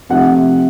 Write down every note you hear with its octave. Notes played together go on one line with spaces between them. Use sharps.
C3 F3 A3 F#5